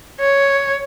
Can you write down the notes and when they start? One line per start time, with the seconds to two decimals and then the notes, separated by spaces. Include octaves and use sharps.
0.20 C#5